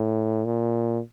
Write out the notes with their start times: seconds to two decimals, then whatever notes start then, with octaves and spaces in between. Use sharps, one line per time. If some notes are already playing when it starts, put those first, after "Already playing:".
Already playing: A2
0.45 A#2